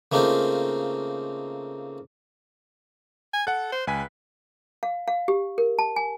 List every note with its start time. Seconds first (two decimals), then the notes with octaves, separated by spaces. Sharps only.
0.12 C#3 A3 A#3 C4 D#4 F4
3.34 G#5
3.47 A4 F#5 F#6
3.72 C5
3.87 C#2 B4 G#5 B6
4.83 F5
5.08 F5
5.28 G4
5.58 A#4
5.79 A5
5.96 G#5